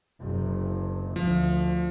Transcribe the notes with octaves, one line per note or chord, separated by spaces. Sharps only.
F#1 C3
D2 F3